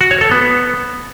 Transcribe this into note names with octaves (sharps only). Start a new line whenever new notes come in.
F#4
C#5
A4
B3